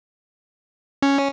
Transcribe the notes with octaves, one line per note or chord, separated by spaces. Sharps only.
C#4